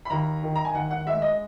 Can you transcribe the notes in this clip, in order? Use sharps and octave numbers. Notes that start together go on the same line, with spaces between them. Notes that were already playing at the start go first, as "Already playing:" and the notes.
B5
D#2 A#5
D#3
A#5
G#5
D#2 F#5
F#5
G#3 E5
D#5